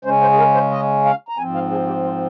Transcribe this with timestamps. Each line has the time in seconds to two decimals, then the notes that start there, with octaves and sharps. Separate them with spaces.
0.05 C#3 G#3 C#4 C5
0.22 C5
0.33 G#4
0.38 A#4
0.54 C5
0.71 D#5
1.05 F5
1.29 A#5
1.38 G#2 F3 C4 G#5
1.54 F5
1.71 G#4
1.87 G4
2.05 F4